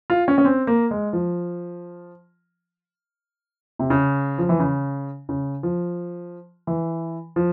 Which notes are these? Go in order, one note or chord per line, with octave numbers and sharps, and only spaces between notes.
F4
C#4
C#4
C4
A#3
G#3
F3
C3
C#3
F3
E3
C#3
C#3
F3
E3
F3